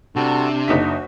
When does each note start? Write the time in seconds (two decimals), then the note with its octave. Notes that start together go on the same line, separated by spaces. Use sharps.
0.16 C3 G3 D4 F#4 A4
0.68 F#1 D#4 F#4 B6